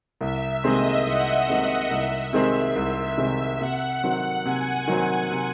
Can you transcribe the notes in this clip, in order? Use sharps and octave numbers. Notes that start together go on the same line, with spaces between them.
C2 E5
C3 D#3 G#3 C4 D#5
C2 F#5
C3 D#3 G#3 C4 E5
C2
C3 D#3 G#3 C4
C2
C3 D#3 G#3 C4
C3 F#5
D#3 F#3 C4 F#5
C3 G#5
D#3 F#3 C4 F#5
C3